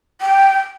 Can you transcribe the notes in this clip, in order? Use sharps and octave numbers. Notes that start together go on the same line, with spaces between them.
G5